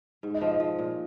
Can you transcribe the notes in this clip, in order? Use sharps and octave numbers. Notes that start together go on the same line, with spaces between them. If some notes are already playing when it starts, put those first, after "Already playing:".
G#2
D#5
F3
D#5
F3
A#2